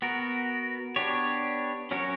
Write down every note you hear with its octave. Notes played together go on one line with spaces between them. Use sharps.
B3 F#4 A#4
B3 D4 G4 C#5
F#3 C#4 F#4 A#4 C#5